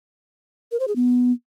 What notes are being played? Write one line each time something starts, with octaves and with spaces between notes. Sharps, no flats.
A#4
C5
G#4
B3